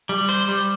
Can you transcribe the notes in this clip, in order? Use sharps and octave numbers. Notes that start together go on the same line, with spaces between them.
G3
C5
G3